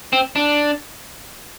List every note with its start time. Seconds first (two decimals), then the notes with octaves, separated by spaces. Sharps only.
0.13 C4
0.36 D4